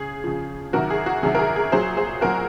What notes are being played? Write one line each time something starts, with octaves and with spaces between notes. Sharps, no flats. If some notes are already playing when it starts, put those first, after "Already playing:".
Already playing: C#3 G#4
C#3 F3
C3 D#3 F#3 F#4 A#4
G#4
F#4
C3 D#3 F#3 G#4
A#4
G#4
G#4
A#2 F#3 G#4 C5
G#4 C5
A#2 F#3 F#4 A#4